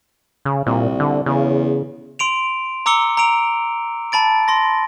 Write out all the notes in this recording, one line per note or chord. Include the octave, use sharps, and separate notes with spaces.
C#3
C2 A#2
D3
E2 C#3
C6 D7 F7
A#5 D6 E6 C#7 G7
A#5 E6 D7 F7
A5 B5 A6 D7
C6 A#6